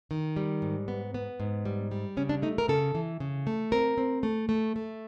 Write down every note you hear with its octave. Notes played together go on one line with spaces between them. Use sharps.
D#3
G3
G#2
B3
B3
G#2
G3
G3
C#3 C#4
D4
A3 D#4
A#4
C#3 A4
E3
C#3
A3
C4 A#4
C4
A3
A3
A3